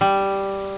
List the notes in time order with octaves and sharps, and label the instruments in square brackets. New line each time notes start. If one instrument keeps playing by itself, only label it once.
[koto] G3